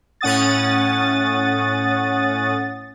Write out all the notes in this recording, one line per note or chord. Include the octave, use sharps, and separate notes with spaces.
A2 C#4 F#5 D#6 A6